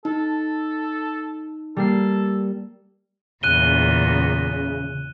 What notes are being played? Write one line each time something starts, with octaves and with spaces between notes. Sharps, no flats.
D#4 A4
G3 A#3 A4 C7
E2 A#2 C#3 F#6 D#7 G7